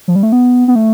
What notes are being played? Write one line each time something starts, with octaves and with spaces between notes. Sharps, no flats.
F3
G3
A3
B3
B3
A3